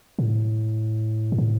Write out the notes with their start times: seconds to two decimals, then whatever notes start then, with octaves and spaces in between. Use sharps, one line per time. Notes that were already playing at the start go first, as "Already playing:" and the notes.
0.19 A2
1.32 G#2
1.38 A2